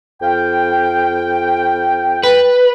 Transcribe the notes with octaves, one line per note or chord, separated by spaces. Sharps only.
F2 F5 G5
B4